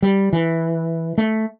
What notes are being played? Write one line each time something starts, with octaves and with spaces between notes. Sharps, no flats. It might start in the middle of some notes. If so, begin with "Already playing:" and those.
G3
E3
A3